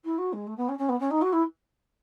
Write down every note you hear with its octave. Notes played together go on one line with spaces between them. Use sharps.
E4
F#4
G#3
A3
B3
C#4
C#4
B3
C#4
D#4
F#4
E4